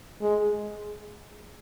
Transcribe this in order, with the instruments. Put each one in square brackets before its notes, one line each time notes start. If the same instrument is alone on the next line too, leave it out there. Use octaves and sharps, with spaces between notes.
[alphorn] G#3